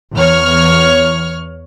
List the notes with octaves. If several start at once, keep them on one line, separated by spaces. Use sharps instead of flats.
E2 C#5 F6